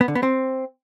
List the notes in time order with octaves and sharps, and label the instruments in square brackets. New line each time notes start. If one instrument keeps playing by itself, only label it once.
[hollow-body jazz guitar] B3
D3
B3
C4